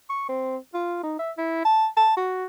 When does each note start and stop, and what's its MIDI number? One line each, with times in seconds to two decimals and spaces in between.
0.10 0.27 85
0.29 0.57 60
0.74 1.00 65
1.03 1.14 63
1.19 1.31 76
1.38 1.60 64
1.65 1.87 81
1.97 2.17 81
2.17 2.46 66